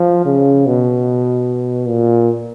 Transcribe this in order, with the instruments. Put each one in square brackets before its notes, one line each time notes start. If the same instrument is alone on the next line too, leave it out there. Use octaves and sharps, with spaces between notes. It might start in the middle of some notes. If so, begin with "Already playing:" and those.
Already playing: [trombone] F3
C#3
B2
A#2